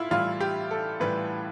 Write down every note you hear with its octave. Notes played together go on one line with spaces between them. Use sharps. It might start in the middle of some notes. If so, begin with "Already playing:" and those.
Already playing: A2 E4 F4
A2 E3 G3 F4
G4
A4
A2 E3 G3 B4